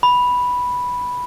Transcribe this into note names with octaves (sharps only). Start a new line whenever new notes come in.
B5